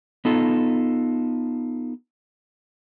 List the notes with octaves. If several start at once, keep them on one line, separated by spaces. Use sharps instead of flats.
B3 D#4 F4 A4